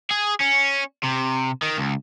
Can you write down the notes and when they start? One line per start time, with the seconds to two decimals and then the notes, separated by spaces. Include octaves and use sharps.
0.11 G#4
0.41 C#4
1.03 C3
1.62 D#3
1.78 C#2